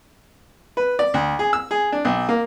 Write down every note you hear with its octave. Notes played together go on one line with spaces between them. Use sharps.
B4
D5
D2
G#4
E6
G#4
D4
B1
A#3